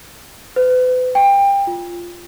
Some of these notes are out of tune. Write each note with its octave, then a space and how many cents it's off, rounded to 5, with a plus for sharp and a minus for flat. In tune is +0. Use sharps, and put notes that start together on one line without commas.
B4 +40
G5 +25
F4 -10